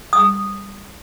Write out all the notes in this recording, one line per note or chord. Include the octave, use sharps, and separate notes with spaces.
D#6